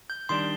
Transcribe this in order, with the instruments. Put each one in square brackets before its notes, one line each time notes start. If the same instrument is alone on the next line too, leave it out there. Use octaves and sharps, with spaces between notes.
[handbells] G6
[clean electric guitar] D#3 G3 D4 [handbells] C6